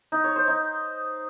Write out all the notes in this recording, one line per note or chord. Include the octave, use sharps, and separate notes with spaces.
D#4
C#5
C5
D#4